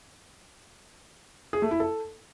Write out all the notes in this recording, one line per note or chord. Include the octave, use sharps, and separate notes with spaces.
G#4
A3
E4
A4